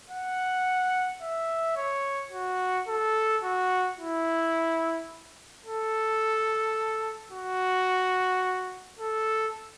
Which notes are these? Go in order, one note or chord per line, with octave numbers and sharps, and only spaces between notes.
F#5
E5
C#5
F#4
A4
F#4
E4
A4
F#4
A4